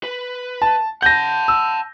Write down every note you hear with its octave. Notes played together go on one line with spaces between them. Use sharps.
B4
A5
F#5 A5 G6 A#6
E6